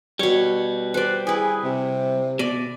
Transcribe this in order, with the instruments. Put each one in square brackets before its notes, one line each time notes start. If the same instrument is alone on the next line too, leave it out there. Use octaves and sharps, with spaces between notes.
[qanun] B2 C#5 [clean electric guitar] G3
[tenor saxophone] B4 [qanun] C5 D5
[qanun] E4 B4 [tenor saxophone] G#4
[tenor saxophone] C3
[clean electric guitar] B2 [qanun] D5